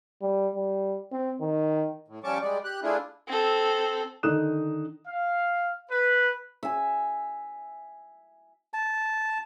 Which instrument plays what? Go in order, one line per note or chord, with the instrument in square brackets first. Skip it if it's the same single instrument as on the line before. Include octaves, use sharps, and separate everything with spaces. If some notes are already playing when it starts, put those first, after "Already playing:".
[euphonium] G3
G3
C4
D#3
[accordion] A2
F3 G3 C#4 A5 C#6 D6
G3 G#3 D5
G4 F#6
A3 D4 E4 F4 G#4
[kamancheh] C4 A4
[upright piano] D3 D#3 D#4 D#6 F#6 E7
[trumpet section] F5
B4
[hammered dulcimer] E5 G#5
[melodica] A5